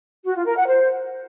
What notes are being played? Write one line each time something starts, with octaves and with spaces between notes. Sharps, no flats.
F#4
F4
A#4
F#5
C5